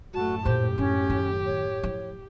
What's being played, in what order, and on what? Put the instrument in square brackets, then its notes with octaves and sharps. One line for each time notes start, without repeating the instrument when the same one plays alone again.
[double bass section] F#2 A2 [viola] A3 A5 [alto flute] F#4
[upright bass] A#2 A3 [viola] G4 [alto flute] C5
[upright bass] D3 G3 [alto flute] C#4
[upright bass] D#3
[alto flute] C#5
[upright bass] F3 E4